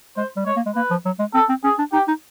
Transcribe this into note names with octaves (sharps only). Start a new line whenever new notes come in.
G#3 C5
G3
G#3 C#5
A#3
G#3
A#3 B4
F3
F#3
G#3
C4 A4
C4
C#4 G#4
D4
D#4 G4
D#4